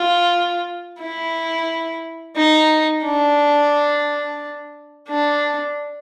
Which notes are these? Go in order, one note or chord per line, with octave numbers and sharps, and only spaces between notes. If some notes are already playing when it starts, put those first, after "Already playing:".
Already playing: F4
E4
D#4
D4
D4